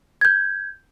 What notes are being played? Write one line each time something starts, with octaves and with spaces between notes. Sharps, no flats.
G6 G#6